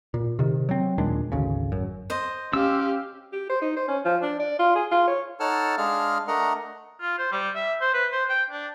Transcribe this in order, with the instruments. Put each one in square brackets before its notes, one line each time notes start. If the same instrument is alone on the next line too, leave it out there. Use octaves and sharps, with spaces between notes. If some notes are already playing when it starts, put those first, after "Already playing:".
[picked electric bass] A#2
C3 D#3
F#3 C4
D#2 A#2 G#3 D4
G#1 D2 C#3
F#2
[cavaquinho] C5 D#5
[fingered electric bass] C#4 [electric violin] G4 F5 [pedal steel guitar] E6
[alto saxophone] G4
C5
D#4
C5
C#4
F3
D4
D5
F4
G#4
F4
C#5
[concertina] D#4 A4 C#5 F#5 A5 F6
G#3 D4 G#4 F5 F6
A3 D4 A#4 D#5 F#5 A#5
[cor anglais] F4
C5
G3
E5
C5
B4
C5
G5
D4